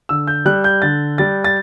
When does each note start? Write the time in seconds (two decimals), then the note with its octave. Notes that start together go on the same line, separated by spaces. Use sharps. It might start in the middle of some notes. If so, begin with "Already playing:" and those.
0.09 D3 E6
0.27 G6
0.45 G3 F#6
0.64 G6
0.82 D3 A6
1.18 G3 A6
1.44 A6